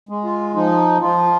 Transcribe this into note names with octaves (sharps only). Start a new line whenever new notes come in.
G#3
F4
F3 D#4
F3 F4